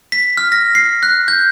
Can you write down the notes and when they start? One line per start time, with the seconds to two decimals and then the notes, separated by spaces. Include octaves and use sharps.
0.12 B6
0.37 F6
0.52 A#6
0.75 C7
1.03 F#6
1.28 G6